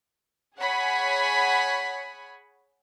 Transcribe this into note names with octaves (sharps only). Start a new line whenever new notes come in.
G#4 C#5 F#5 G#5 B5